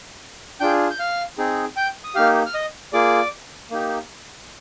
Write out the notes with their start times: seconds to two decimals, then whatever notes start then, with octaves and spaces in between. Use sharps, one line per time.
0.60 D4 F4 G#4 G5 G6
0.90 G6
0.99 F5 F6
1.38 C4 D#4 G#4
1.76 G5 G6
2.04 D#6
2.15 A#3 D#4 G4 F5 F6
2.46 F6
2.54 D#5 D#6
2.93 A#3 F4 G#4 D5 D6
3.71 A#3 D#4 G4